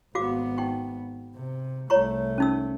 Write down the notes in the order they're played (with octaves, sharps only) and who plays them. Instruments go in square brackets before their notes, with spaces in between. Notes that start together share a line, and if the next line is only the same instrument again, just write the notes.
[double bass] G#1 B3 [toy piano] F#4 F5 D6
[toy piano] D#4 G5 C#6
[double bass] C3
[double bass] C2 A3 [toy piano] C#5 A#5 C#6
[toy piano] C#4 D#4 E6